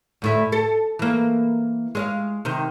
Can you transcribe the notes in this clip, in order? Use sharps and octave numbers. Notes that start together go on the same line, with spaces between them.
D2 A2 E5
A4
E3 A#3
G#3 D#5 F5
C3 D#3